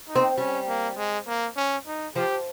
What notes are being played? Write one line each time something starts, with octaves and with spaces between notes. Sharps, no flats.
D#4
C4
G3 C#4
A#3
G#3
A#3
C#4
D#4
F3 G4